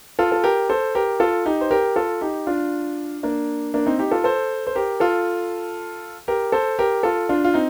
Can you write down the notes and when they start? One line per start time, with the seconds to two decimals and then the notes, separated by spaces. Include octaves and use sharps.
0.19 F4 A4
0.32 A4
0.44 G4 A#4
0.69 A4 C5
0.95 G4 A#4
1.20 F4 A4
1.45 D#4 G4
1.61 C5
1.71 G4 A#4
1.96 F4 A4
2.21 D#4 G4
2.47 D4 F4
3.23 A#3 D4
3.74 A#3 D4
3.86 C4 D#4
3.99 D#4 G4
4.11 F4 A4
4.24 A4 C5
4.67 C5
4.75 G4 A#4
5.00 F4 A4
6.28 G4 A#4
6.52 A4 C5
6.79 G4 A#4
7.03 F4 A4
7.29 D4 F4
7.44 F4
7.54 C4 D#4